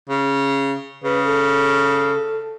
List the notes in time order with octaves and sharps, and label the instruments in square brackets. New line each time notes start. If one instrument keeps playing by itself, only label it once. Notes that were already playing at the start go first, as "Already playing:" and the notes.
[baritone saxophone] C#3
[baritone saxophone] C#3 [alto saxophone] B4
[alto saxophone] A4